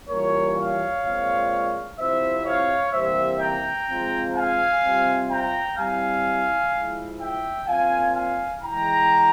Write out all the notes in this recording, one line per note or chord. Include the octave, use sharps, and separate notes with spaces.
E3 G3 A#3 C#4 F4 A#4 C#5
C#5 F5
A#2 G#3 C4 F4
C3 F3 C4 E4 C5 E5
C#5 F5
C3 E3 G3 A#3 C5 E5
G5 A#5
F3 G#3 C4 F4
F5 G#5
C3 G3 C4 F4
G5 A#5
G3 C4 E4 F5 G#5
F3 G#3 E4
E5 G5
A#2 F3 C4 F4 F5 G#5
F5 G#5
E3 G#3 E4 G5 A#5